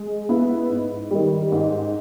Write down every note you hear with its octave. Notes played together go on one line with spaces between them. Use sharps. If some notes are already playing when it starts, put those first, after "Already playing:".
Already playing: G#3
B3 E4
G#2
D#3 G3
G#2